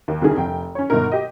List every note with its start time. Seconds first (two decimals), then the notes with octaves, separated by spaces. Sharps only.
0.08 D#2
0.22 C2 D3 D#3 G#4
0.37 F1 G5
0.75 C#4 C#5
0.90 G1 B2 D#3 D#4 A#4
1.12 G4 D#5